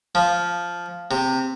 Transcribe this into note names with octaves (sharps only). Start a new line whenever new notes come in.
F3
C3